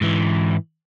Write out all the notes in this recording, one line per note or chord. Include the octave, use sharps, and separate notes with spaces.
G#2 E3